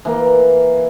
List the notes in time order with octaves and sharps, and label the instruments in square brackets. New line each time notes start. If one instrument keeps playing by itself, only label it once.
[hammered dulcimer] E3 A#3